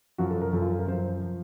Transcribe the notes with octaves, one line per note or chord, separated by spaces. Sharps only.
F#2 F3 F#4
A4
A#4
F#2 F3 A4
F4
A4
A#4
F#2 F3 C5
F3